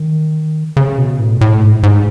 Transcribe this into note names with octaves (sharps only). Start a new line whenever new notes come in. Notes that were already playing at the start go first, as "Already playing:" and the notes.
Already playing: D#3
C#3
B2
A2
A2
G#2
G#2